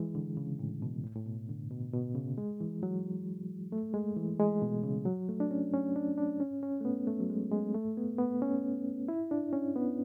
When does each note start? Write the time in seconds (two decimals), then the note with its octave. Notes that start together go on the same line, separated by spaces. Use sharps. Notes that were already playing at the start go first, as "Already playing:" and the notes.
Already playing: E3 G#3
0.15 D3
0.37 C#3
0.59 A2
0.82 B2
1.04 A2
1.15 A2
1.26 B2
1.49 D3
1.70 B2
1.93 B2
2.15 C#3
2.38 G#3
2.61 E3
2.83 F#3
3.72 A3
3.94 G#3
4.17 E3
4.40 G#3
4.62 B2
4.83 C#3
5.06 F#3
5.29 A3
5.40 D4
5.51 C#4
5.74 C#4
5.96 D4
6.18 D4
6.40 C#4
6.63 C#4
6.80 A3
6.85 B3
7.07 A3
7.20 F#3
7.30 G#3
7.51 G#3
7.75 A3
7.97 B3
8.19 B3
8.42 C#4
9.08 E4
9.31 D4
9.53 C#4
9.76 B3